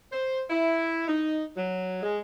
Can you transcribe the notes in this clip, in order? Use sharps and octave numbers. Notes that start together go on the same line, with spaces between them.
C5
E4
D#4
F#3
G#3